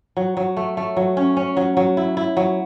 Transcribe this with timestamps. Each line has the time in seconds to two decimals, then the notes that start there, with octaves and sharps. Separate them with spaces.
0.17 F#3
0.37 F#3
0.57 A3
0.77 A3
0.97 F#3
1.17 C#4
1.37 C#4
1.57 F#3
1.77 F#3
1.97 E4
2.17 E4
2.37 F#3